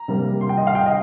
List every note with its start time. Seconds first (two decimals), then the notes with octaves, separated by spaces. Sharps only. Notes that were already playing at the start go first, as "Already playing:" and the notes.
Already playing: A#5
0.08 C3 G3 A#3
0.41 C6
0.49 G5
0.57 D#5
0.67 F5
0.75 G5
0.86 D#5